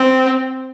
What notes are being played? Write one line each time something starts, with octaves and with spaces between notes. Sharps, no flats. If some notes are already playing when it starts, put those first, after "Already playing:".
Already playing: C4